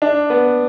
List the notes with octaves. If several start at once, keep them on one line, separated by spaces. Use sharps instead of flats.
D4
B3